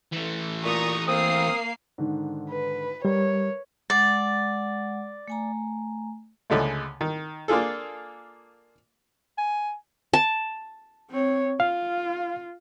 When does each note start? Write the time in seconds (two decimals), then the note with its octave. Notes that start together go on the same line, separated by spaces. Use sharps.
0.12 E3 A3
0.64 A#2 A#5 C#6 D#6
1.08 A#3 C4 F5 D#6 C7
1.98 G#2 D3 D#3
2.50 B4
3.05 G3 A#4 C#5
3.90 G#3 D5 F#5
5.28 A3 G#5 A#5
6.50 C#2 D3 G#3 A3
7.01 D#3
7.48 A#3 D4 F4 G#4 A4
9.38 G#5
10.13 A5
11.11 C4 C#5
11.60 F4 F5